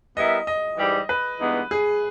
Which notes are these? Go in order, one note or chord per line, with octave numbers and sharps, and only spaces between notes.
G3 B3 E4 A#4 D#5 E5
D#5
G#2 E3 G3
B4
G2 E3 G#3 B3 D#4
G#4